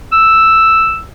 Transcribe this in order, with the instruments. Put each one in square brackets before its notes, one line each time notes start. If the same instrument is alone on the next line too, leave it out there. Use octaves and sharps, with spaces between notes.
[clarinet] E6